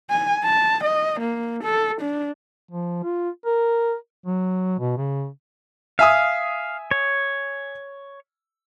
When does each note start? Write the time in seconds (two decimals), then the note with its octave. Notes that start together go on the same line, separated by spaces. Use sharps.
0.10 G#5
0.44 A5
0.84 D#5
1.20 A#3
1.64 A4
2.01 D4
2.71 F3
3.03 F4
3.45 A#4
4.26 F#3
4.79 B2
4.97 C#3
5.99 E5 F5 G#5 D#6
6.91 C#5